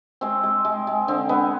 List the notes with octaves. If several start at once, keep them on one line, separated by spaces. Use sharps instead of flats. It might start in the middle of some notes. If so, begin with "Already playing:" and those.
G#3 C4
G#3
G#3
G#3
D3 C4
G#3 B3